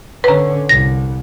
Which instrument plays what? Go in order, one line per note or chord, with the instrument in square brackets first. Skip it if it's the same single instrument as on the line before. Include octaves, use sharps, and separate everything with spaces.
[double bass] D3 C#4 [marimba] B4 A#5
[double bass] C2 [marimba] A#6